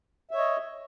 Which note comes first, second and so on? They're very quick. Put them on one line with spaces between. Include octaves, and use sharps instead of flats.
E5 C#5 D#5